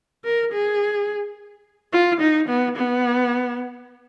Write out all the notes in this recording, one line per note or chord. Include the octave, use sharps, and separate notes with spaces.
A#4
G#4
F4
D#4
B3
B3